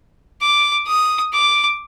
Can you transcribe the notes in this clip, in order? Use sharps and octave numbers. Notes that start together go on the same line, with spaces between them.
D6
D#6
D6